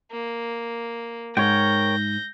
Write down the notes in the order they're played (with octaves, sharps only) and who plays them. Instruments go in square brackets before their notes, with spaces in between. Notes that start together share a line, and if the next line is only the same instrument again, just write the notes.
[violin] A#3
[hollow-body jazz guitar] G#2 [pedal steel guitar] A#4 C#5 G5 [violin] G6 A#6